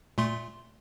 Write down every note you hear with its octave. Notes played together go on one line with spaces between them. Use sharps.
A#2 A3 C6